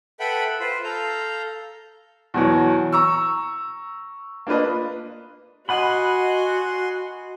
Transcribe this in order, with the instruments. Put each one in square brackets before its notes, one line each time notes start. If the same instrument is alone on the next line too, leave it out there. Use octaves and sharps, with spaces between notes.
[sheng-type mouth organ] A4 B4 E5 F#5 G5 B5
F4 B4 C5
A4 F5 A#5 G6
[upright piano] E2 B2 E3 F#3
A#5 C#6 E6
A#3 D4 F4 B4 D#5
[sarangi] F#4 [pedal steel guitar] D#5 F#5 B5 [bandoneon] G#5 C6